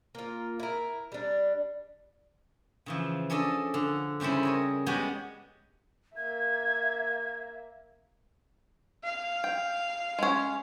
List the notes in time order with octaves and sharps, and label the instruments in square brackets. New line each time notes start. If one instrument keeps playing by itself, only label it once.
[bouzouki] A#3 F4
E4 A#4
G3 D4
[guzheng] C#3 E3 F3
C#4 D4 A4 D5 D#5 A5
D3
C#3 G3 C4 C#4 E4
A#4 C#5 D#5
G3 G#3 B3 C#4 F#4 G4
[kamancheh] A#3 E5 [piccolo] G#6
[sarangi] F5
[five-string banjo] G5
G#3 C#4